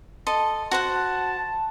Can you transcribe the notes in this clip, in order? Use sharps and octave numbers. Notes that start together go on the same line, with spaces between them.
A4 D#5 C6
F#4 C5 F#5 A5